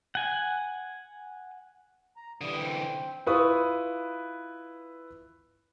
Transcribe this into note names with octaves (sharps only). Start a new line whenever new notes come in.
F#5 G#5
A#5
D3 E3 G3 D#6
C4 G5
E4 F4 B4 C#6 D#6